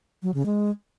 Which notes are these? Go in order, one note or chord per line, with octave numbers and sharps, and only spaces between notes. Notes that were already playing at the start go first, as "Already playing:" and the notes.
F#3
C#3
G#3